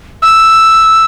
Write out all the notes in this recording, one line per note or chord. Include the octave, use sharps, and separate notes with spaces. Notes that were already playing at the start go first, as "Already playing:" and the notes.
E6